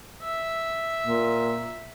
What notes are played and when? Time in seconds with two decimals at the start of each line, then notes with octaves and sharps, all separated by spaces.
0.23 E5
1.05 A#2